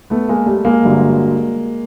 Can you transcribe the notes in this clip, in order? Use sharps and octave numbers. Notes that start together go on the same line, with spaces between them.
A3 B3
G#3 A#3
G3 A3
G#3 A#3
G1 G2 D3 F#3